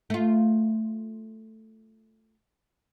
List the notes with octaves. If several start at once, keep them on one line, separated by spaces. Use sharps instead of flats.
A3 F4